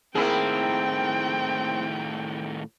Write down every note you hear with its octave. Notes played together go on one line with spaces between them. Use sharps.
A2 D#3 A#3 C4 E4 G#4 G5